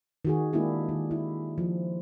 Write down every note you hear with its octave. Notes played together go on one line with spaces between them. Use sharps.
D#3 F#4 G#4
G#3 A#3 D4 E4 G4
D#3
E4
F3